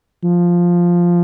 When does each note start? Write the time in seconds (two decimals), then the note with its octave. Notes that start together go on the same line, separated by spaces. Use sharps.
0.24 F3